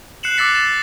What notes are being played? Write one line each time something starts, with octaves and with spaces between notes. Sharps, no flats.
F#6 C7 C#7 E7 F#7
D6 E6 F#6 A6 B6 C#7
A6 E7